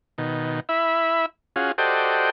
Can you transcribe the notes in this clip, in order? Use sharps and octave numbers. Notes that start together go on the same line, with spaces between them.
B2 D#3
E4 E5 B5
C#4 F4 F#4 G#4
F#4 G4 A4 C5 D5 D#5